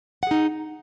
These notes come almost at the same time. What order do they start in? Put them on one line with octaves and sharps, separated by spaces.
F#5 G#4 D#4